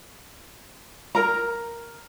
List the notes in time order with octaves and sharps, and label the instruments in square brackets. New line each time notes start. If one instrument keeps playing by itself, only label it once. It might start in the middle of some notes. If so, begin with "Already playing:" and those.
[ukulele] A#4 A#5